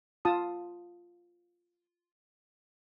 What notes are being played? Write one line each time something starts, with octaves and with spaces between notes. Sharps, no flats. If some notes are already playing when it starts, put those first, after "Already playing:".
F4 A5 D#6